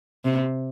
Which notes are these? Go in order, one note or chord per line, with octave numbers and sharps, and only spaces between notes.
C3